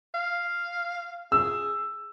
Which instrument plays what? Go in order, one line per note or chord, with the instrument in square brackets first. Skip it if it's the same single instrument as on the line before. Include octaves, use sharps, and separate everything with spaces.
[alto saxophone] F5
[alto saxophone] G#4 [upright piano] E6